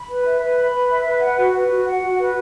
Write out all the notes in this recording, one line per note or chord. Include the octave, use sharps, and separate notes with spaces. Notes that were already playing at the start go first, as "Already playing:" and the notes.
Already playing: B5
B4
E5
B4
B5
B4
E5
B4
F#5
F#4
B4
F#4
F#5
F#4
B4